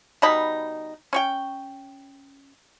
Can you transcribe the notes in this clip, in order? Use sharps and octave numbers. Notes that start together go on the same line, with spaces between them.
B2 G3 D#4 B5
C#4 C#5 G5